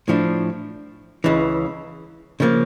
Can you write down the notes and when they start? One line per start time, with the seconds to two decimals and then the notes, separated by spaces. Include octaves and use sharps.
0.08 A2 F3 A3 D4
1.24 C#2 C#3 E3
2.40 C#3 F3 A#3